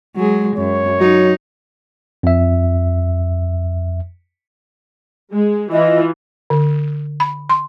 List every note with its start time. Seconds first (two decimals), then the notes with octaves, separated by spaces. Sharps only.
0.16 F#3 G#3 G#4
0.57 F#2 C#5
1.00 F#3 D#4
2.23 F2 E5
5.33 G#3
5.72 E3 F4 D#5
6.50 D3
7.20 B5
7.50 C6